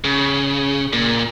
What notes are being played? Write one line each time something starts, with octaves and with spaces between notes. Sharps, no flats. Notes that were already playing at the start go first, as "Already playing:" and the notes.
C#3
A#2